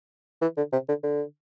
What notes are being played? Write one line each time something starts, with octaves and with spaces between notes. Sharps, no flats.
E3
D3
C3
D3
D3